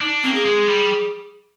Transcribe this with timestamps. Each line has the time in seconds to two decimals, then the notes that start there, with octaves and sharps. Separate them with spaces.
0.01 D4 D#4
0.23 A#3 C4
0.35 G#4
0.45 G#3
0.68 G3